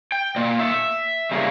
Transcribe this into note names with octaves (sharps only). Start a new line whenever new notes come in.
G5
A#2 A#3 D5
E5
C#3 G3 A#3